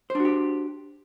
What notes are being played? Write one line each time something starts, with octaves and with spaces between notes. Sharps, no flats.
D4 F#4 G4 C5